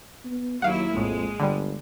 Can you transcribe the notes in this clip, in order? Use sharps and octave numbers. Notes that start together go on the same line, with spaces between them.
B3
D#2 F#3 A#3 E4 F5 F#5
A#1 F2 A2 G#3
G1 D3 G3